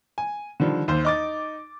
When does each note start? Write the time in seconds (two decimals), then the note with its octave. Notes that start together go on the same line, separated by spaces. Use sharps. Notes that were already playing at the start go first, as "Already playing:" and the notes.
0.18 G#5
0.60 D3 D#3 F3 G3
0.88 D#2 C5
1.05 D#4 D6 A6